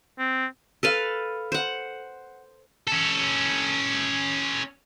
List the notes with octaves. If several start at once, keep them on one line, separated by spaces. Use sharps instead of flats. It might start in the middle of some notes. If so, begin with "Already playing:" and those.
C4
A4 B4 F5
C5 F#5
C#4 A4